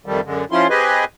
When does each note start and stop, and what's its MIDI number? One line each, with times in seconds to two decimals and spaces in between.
0.06 0.20 41
0.06 0.20 51
0.06 0.20 55
0.06 0.20 57
0.25 0.44 42
0.25 0.44 50
0.25 0.44 56
0.52 0.67 53
0.52 0.67 61
0.52 0.67 64
0.52 0.67 65
0.52 0.67 84
0.70 1.05 60
0.70 1.05 67
0.70 1.05 68
0.70 1.05 71
0.70 1.05 75
0.70 1.05 80